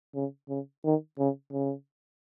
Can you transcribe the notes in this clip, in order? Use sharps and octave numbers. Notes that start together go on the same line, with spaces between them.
C#3
C#3
D#3
C#3
C#3